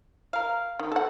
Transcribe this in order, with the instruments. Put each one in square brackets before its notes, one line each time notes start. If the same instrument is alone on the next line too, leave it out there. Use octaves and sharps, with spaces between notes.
[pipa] A#4 F5
[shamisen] D#3
A4 F#5